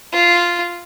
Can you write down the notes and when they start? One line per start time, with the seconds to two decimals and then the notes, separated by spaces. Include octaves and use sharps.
0.12 F4